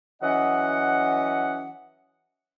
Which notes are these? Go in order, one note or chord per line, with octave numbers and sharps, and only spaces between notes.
E3 F#3 C#4 D#5 F#5